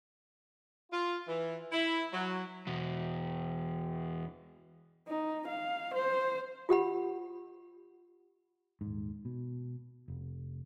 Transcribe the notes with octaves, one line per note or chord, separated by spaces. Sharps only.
F4
E3
E4
F#3
E2 B2
D#4
F5
C5
F4 G4 F#5 B5
D#1 G#2
B2
F1